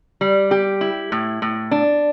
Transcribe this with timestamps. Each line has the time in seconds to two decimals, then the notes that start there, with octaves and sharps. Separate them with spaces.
0.21 G3
0.51 G4
0.81 E4
1.12 A2
1.42 A2
1.71 D4